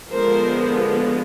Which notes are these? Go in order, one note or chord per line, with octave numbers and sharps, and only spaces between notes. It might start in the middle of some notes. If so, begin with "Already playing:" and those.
D3 F3 G#3 B3 A#4 C5